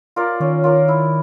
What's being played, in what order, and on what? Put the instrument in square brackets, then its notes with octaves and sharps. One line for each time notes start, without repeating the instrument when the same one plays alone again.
[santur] F4 A#4 D5
[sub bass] D#3 [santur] C#4
[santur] F4 A#4 D5
E4